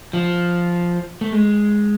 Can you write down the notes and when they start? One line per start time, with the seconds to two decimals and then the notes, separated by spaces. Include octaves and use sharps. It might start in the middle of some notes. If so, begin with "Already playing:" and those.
0.13 F3
1.21 A3
1.32 G#3